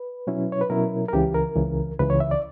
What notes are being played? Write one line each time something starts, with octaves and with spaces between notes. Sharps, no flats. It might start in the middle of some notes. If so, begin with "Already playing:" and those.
Already playing: B4
B2 F#3 C#4 E4
C#5
B4
B2 F#3 C#4 E4 A#4
A#4
C#2 C#3 E3 G4
A#4
C#2 C#3 E3
C#2 C#3 E3 B4
C#5
E5
D5